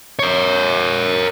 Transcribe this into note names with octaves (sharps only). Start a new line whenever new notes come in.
A#4 C#5